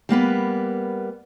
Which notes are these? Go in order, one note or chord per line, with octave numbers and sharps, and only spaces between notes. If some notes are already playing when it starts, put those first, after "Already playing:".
G3 A#3 B3 B4